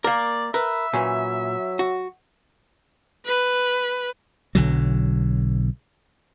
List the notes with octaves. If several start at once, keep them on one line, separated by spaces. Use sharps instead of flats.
A#3 A#4 D5
A#4 B4 E5
A#2 E3 F#3 C#4
F#4
B4
B1 D3 F#3